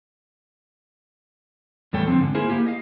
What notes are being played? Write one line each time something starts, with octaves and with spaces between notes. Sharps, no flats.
E2 A2 G3 A4 C#5 G5
D3 F3 C4
G#2 D3
A#3 E4 G#4 A#4 C5
A#3 E4 G4
D#5 F5